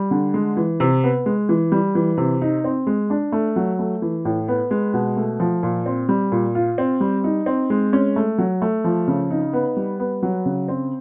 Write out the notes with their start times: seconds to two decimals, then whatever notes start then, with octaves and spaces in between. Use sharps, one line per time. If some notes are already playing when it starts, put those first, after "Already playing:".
Already playing: G3
0.11 D3
0.34 G#3
0.57 E3
0.80 C3
1.04 B3
1.26 G#3
1.49 E3
1.72 G3
1.95 E3
2.18 C3
2.42 D#4
2.64 C4
2.87 G#3
3.10 D4
3.32 A3
3.56 F#3
3.79 A3
4.02 E3
4.25 A2
4.48 B3
4.71 G#3
4.94 B2
5.17 A3
5.40 F3
5.63 A#2
5.86 C4
6.09 G3
6.32 A#2
6.55 F4
6.78 C4
7.01 G3
7.24 D#4
7.46 C4
7.70 G#3
7.93 C#4
8.16 A3
8.38 F#3
8.62 A3
8.84 F3
9.08 C#3
9.31 D#4
9.53 B3
9.77 G3
9.99 B3
10.23 F#3
10.46 C#3
10.68 C4